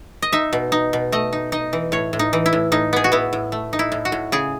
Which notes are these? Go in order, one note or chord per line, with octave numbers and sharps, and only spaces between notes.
D#5
D#4 E5
B2
D#4
B2
A3 D#5
D#4
D#4 D#5
E3
A2 C#5
A2
D#4
E3
E4
A2
A2 D#4
B3 G#4
F#4
B3 E4
A2
A3
D#4
E4
A2
F#4
A2
C#3 G#4